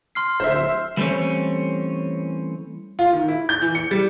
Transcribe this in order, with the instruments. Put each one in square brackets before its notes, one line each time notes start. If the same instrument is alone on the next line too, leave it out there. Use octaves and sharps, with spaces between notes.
[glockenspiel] C6 F6 C7
[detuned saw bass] D1 [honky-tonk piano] C5 E5
[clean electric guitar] E3 G3 A3 C4 C#4
[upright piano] F4
D#3
E4
G6
E3
C#7
G3